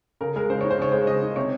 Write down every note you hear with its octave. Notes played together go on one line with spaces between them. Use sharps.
C#3 A#4
G#3 A#4
C#3 C5
D#4 C#5
C5
C#3 C#5
G#3 C5
C#3 D#5
D#4
C3 C#5